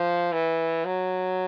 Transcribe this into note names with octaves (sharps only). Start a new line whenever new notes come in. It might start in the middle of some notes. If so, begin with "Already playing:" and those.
Already playing: F3
E3
F#3